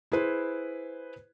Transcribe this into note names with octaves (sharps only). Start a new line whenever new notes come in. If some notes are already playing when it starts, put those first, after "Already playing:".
E4 G#4 B4 C5